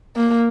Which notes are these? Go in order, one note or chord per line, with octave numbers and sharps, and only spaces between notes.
A#3